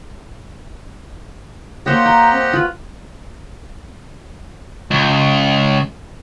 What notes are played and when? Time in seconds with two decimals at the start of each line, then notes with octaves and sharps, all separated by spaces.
1.86 A#3 G4 C5 C#5 D#5 F#5 C6
2.06 G5 A#5
2.32 C4
2.53 F4 F#4 B4
4.91 C#2